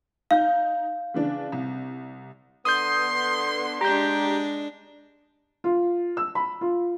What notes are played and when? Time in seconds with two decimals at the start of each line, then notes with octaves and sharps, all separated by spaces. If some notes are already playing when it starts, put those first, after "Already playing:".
0.31 D#4 F5 G6
1.14 C#3 E3 D4
1.52 C2
2.65 D3 B3 C6 D#6 G6
3.81 G#3 D4 G4 A#5 G6
5.64 F4
6.17 E6
6.35 B5
6.61 F4